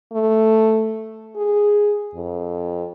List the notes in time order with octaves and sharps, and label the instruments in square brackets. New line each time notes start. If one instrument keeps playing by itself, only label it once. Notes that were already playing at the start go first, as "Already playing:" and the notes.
[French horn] A3
G#4
F2